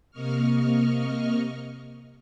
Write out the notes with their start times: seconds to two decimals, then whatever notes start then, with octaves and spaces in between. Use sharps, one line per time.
0.11 C3 A#3 D#5 C#6 F6